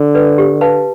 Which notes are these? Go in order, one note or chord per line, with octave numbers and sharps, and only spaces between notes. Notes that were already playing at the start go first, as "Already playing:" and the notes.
Already playing: D3
B4 D5
G4
B4 F5 A5